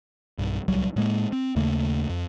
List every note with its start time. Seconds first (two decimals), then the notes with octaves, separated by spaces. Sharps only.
0.38 B1 G2
0.68 D1 C2 F#3 G3
0.96 A2 G#3 A#3
1.32 C4
1.56 D#2 C#3 A3 A#3
2.10 F2